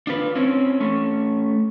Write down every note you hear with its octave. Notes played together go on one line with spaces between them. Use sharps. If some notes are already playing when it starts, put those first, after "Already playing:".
D4 F4 B4
C4 C#4 E4
A3 C#4